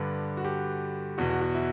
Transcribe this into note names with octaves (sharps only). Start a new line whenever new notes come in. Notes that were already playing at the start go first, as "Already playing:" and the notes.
Already playing: G2 D3 B4
F#4
G4
E2 B2 F#4
F#4
F#4
E4